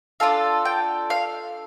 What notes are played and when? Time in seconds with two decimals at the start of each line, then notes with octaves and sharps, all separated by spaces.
0.20 D4 F4 A4 F5
0.65 G5
1.10 F5